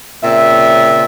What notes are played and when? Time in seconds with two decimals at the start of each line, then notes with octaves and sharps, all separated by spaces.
0.24 A#2 C#3 C4 E5